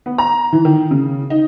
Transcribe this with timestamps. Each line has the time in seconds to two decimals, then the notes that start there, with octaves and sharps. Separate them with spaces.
0.06 B3
0.18 A#5
0.53 E3
0.65 D#3
0.91 C#3
1.30 D#4